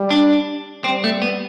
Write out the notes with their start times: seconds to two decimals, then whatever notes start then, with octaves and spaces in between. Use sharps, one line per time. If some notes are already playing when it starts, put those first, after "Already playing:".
Already playing: G3
0.10 D4
0.84 G3 C4
1.04 A3
1.22 B3